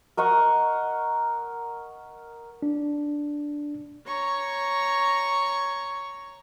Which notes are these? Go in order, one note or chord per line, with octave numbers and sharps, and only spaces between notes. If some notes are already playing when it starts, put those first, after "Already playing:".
A#4 D#5 F#5 C#6
D4
C#5 A#5 C#6